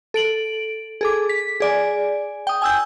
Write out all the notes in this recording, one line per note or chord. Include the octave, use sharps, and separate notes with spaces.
A4 D7 F#7
G#4 A4 D6
B6
G#4 D5 G#5
G5 D#6
G#5 E6 G6